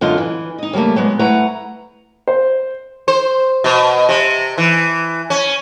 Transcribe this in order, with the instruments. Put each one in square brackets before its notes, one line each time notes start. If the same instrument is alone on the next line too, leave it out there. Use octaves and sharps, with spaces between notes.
[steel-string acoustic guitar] F#2 D3 F4 D#5
E3
D#4 D#5
C#3 F#3 G3 A3 A#3
F#3 G#3 B3
A3 E4 B4 F#5 A#5
[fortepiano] C5
[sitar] C5
B2
C3
E3
C#4